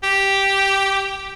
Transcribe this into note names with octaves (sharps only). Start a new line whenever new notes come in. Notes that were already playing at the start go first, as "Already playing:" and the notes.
G4